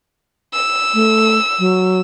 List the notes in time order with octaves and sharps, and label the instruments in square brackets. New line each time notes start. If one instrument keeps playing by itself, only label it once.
[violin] E6
[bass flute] A3
F#3